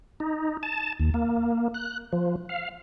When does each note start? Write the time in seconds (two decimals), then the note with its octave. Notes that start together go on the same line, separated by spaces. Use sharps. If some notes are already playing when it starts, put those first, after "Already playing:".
0.20 D#4
0.63 A5
1.00 D#2
1.14 A#3
1.74 F#6
2.13 F3
2.49 F5